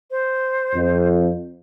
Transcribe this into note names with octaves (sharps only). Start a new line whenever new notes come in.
C5
F2